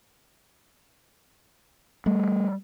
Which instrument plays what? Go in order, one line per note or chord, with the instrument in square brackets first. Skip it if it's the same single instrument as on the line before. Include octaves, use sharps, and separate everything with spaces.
[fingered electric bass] G3 A3